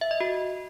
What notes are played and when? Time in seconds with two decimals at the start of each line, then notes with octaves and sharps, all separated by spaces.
0.01 E5
0.11 D#5
0.20 F#4